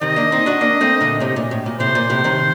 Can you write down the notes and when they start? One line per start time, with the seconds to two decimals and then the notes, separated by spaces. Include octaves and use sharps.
0.01 C3 D#3 D#5
0.16 A#3 D4
0.32 C4 D#4
0.46 D4 F#4
0.61 A#3 D4
0.81 A3 C4
1.00 A#2 D3
1.20 A2 C3
1.36 A#2
1.51 A2
1.66 A#2
1.80 A2 C3 C5
1.95 A#2
2.10 A2 C3
2.24 C3 D#3